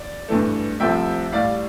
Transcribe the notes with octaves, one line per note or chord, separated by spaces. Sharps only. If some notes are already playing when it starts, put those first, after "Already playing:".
Already playing: D5
G2 E3 A3
C2 C3 F3 A3 E5 G5
A2 G3 D5 F5